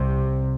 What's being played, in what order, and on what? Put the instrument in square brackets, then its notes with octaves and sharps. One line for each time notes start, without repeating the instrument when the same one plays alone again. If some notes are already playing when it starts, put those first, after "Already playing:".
Already playing: [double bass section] C2 C3